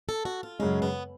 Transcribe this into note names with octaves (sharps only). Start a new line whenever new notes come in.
A4
F#4
F4
F#2 C#3 G#3 C#4
B3